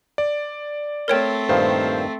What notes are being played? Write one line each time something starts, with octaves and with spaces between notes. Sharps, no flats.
D5
A3 C4 A#4 C#5 G5
G2 A#2 D#3 C5 F5